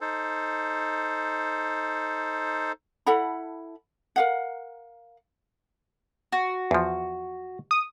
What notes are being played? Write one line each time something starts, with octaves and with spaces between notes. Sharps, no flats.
D#4 A4 C5
E4 A4 F#5 B5
A#4 F5 F#5
F#4
E2 F3
D#6